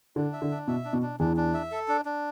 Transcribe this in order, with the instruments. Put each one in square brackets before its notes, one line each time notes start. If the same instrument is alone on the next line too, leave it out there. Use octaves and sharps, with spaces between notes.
[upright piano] D3 [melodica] D4
[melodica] E5
[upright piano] D3
[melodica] D4
[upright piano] B2 [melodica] E5
[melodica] D4
[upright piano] B2
[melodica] D4
[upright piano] E2 E3 [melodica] D4
[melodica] D4
E5
A4
D4
D4